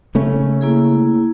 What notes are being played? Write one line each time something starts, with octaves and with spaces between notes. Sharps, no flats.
C#3 A3 C#4
A#3 E4 G#4